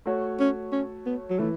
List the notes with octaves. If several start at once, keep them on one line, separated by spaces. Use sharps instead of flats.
A3 F#4 C#5
C#4
C#4
B3
F#3
E3 A3